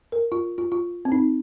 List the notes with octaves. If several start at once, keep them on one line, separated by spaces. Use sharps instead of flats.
A#4
F4
F4
F4
C4
D#4